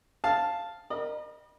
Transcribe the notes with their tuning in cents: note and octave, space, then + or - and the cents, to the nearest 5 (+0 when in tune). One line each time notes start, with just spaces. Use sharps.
F5 -5 A5 +0
A#4 +0 D#5 -40 B5 -35